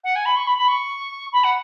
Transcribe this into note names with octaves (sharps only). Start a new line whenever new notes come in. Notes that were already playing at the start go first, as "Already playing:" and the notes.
F#5
G#5
B5
C#6
B5
B5
C#6
B5
F#5